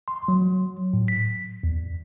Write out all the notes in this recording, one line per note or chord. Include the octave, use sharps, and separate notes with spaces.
C6
F#3
A2
B6
E2